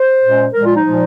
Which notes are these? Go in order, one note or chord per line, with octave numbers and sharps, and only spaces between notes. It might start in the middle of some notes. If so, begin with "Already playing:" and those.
Already playing: C5
A#2 G#3 C#4
A#2 F3 G#3 A#4
F4
D#4
A#2 F3 G#3